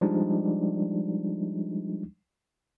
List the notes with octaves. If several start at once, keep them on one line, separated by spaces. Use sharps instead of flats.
F3 G3 G#3 D4 D#4